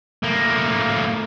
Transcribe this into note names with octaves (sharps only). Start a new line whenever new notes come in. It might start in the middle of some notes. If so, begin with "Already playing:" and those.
A2 A#3